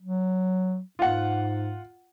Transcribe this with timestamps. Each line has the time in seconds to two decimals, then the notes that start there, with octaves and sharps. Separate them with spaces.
0.01 F#3
0.99 G#2 F4 F#5